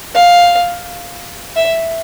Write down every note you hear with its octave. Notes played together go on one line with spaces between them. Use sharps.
F5
E5